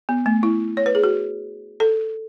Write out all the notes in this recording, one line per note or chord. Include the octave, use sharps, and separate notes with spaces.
B3
A3
E4
C#5
B4
G#4
F#4
A4